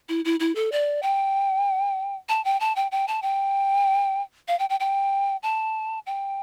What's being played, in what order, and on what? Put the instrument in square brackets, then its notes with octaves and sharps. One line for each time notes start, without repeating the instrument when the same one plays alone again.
[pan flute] E4
E4
E4
A4
D5
G5
A5
G5
A5
G5
G5
A5
G5
F5
G5
G5
G5
A5
G5